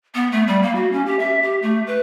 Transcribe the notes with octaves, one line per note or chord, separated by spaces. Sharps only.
B3
A3
G3
A#3
F#4
C#4
G4
E5
G4
A3
B4